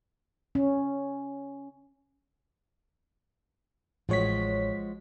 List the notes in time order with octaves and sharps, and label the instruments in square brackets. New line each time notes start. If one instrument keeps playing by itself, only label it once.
[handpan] C#4
[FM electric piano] A1 C#5 B6 [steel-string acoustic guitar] F3 G#3 F#4